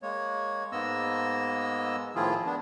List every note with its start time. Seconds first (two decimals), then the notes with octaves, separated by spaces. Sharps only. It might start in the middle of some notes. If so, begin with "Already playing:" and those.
0.02 G#3 A#3 C#5
0.72 G#2 G#3 A#3 B3 D#5 E6
2.15 A2 D#3 F3 E4 F4 G#4
2.46 B3 D4